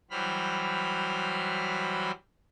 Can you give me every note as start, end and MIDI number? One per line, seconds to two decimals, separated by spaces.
0.11 2.11 52
0.11 2.11 54
0.11 2.11 55
0.11 2.11 72
0.11 2.11 83
0.11 2.11 89